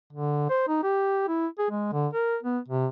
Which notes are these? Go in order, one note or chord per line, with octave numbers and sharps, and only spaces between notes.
D3
C5
D#4
G4
E4
G#4
G#3
D3
A#4
B3
C3